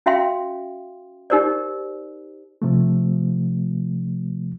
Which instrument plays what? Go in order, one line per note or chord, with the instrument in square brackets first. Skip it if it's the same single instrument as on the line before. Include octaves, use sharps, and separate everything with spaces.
[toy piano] C#4 F#4 E5 F5 G5 C6
D#4 G4 A#4 C5 D5
[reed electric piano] C3 F3 A3